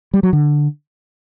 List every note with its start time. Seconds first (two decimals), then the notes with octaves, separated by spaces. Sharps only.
0.14 G3
0.23 F#3
0.33 D3